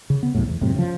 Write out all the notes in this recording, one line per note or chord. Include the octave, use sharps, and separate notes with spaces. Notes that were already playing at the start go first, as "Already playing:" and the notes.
C#3
B3
C2 F#2 A2
E2
F#2 A2 C3
C#3 F3